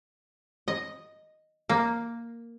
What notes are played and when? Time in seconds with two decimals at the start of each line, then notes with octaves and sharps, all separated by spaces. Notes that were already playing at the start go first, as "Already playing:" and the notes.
0.68 D#5
1.69 A#3